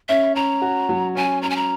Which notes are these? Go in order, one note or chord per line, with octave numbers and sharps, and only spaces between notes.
C#4 E5
C#4 A#5
F#4
F#3
C#4 G#5
C#4 A#5
G#5
A#5